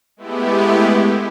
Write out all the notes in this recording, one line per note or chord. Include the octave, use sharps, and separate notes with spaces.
G#3 A3 B3 E4 G4